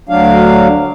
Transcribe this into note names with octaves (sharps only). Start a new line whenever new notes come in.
D2 F#3 D4 F5